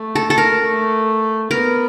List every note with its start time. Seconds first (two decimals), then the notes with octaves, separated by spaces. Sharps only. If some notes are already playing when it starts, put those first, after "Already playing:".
Already playing: A3
0.15 A4
0.30 A4
0.38 A#4
0.59 A3
1.50 B3 A#4